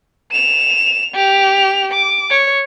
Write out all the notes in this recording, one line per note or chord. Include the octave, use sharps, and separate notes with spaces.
E7 F7
G4 F7
D6
C#5